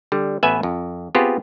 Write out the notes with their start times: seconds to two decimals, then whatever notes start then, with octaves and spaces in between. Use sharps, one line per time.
0.12 D3 G3
0.43 A1 B3 B4 E5 G#5
0.63 F2
1.15 B3 C4 F4 G4 G#4